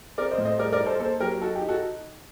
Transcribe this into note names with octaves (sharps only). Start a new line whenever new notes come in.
C4 A#4 D5
C5 D#5
A2
C5 D#5
G3 A#4 D5
A#4 D5
D#4
A4 C5
A#3 A4 C5
F#3 G4 A#4
D#4 F#4 A4
G4
D#4
F#4 A4